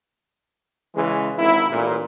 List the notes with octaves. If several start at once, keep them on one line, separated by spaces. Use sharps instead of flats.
C#3 E3 G#3
G#1 E4
A1 A#2